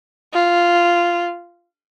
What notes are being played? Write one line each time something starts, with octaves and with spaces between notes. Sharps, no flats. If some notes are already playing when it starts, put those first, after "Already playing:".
F4